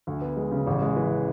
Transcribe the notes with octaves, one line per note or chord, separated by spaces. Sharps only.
D2
B3
G#3
C#3
A1
G#3
E3